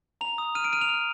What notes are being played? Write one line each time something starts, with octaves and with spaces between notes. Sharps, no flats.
A#5 F7
D#6
F6 D#7
D7
F6 D#7
F7
F6